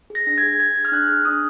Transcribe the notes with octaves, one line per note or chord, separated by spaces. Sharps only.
G#4
A#6
D4
G#6
G#4
G#4 G#6
G#4
F6
D4 F#6
G#4
D4 D#6